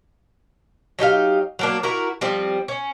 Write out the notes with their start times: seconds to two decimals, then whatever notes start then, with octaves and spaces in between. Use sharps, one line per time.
0.99 F#3 D#4 G4 F5
1.59 F#3 A#3 D4
1.83 E4 F#4 A#4
2.21 F3 G3 C4
2.68 C#4